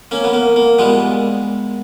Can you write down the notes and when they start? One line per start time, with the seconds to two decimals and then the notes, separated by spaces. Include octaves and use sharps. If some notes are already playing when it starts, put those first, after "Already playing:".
0.11 A#3 C#4
0.24 B3
0.33 A#3
0.56 A#3
0.79 A#2 G3 G#3 B3